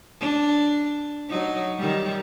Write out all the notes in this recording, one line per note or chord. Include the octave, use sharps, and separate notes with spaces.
D4
F#3 D#4
D#3 G3